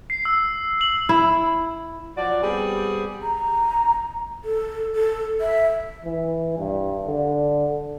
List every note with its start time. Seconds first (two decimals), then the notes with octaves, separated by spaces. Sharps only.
0.10 C7
0.25 E6
0.81 F#7
1.09 E4
2.17 F3 F#3 F#4 D5
2.42 G3 B3 C4 G4 G#4
3.23 A#5
4.44 A4
4.95 A4
5.41 E5
6.05 E3
6.59 G2
7.07 D3